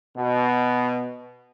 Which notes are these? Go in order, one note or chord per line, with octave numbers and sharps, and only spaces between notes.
B2